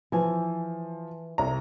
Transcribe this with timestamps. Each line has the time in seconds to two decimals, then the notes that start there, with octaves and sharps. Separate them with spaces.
0.12 E3 F3 G#5
1.38 C2 A#5